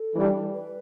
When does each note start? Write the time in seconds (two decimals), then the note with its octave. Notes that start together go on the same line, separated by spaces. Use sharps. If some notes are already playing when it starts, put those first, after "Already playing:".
Already playing: A4
0.15 E3 G3 D4
0.53 B4